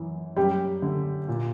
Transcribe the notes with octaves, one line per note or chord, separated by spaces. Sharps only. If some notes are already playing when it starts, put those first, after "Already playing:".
Already playing: F#2 E3
F#2 G3 G4
D3
A#2